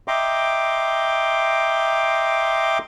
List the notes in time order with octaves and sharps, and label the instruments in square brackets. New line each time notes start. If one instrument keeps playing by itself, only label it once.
[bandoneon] D#5 E5 G5 A#5 C6 D6